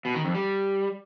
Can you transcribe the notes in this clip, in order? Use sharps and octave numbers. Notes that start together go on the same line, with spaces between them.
B2
D#3
F2
G3